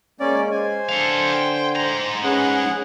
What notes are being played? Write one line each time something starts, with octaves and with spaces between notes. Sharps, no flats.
G#3 A#3 C#4 D5
C5 G#5
D3 A4 F5
G5
G#2 A#5
C#4 G#4 B4 F#5